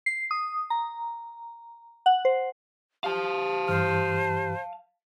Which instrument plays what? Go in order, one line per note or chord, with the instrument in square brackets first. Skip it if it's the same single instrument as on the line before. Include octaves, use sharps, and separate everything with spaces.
[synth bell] C7
D#6
A#5
F#5
C5
[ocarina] G4 [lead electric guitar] F5 A5
[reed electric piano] G2 E3 F6 [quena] C5